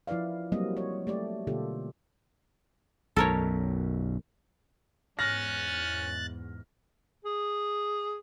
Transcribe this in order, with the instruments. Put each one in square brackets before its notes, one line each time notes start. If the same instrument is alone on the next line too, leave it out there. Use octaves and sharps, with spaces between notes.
[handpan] F3 E4 B4 D5 F5
F#3 G3 A#3 C4 D#5
C#5
A3 G4 D5
B2 D3 A#3 F4 G4 A4
[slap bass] B1 F#2 [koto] A4 A#4 C#5
[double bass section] E2 G#2 [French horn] C#4 [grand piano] F6 A#6 [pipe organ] F#6 A6
[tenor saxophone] G#4